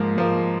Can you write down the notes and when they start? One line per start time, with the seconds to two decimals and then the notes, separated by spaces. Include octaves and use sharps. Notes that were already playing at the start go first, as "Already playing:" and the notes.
Already playing: G#2 F3 A#3
0.17 G#2 F3 A#3